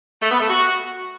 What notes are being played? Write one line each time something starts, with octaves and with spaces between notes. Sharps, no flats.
A3
B3
A3
F#4